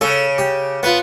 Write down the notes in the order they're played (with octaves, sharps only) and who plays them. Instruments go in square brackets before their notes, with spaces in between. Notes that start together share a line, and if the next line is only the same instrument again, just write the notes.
[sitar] C#3 [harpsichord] A4
[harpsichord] G4
[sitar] B3 [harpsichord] F4 B4 F#5